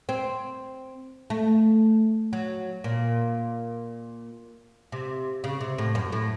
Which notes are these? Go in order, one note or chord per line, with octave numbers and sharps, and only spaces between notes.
C4
A3
F#3
A#2
C3
C#3
C3
A2
F#2
A2